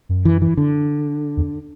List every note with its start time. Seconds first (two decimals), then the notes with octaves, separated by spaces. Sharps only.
0.09 F#2
0.25 E3
0.42 E3
0.57 D3
1.37 E2